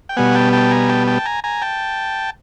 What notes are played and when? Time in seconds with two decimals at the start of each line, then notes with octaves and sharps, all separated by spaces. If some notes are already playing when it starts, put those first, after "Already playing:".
0.09 G5
0.17 B2 G3 B3 F#5 G#5
0.35 G5 A5
0.53 G5 A5
0.71 G#5 A#5
0.89 G5 A5
1.07 G5 A5
1.26 G#5 A#5
1.44 G#5 A#5
1.62 G5 A5